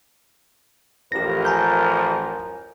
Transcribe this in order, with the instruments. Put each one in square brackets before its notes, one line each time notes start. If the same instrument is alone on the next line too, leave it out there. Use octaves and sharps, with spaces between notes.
[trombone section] A1 F3 A#4 [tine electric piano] G4 A#6
[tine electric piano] G#5 A#5 G6